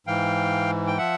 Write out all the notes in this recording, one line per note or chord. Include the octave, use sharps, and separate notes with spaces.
G#2 E3 F5 G5
G5
F3 E5 F#5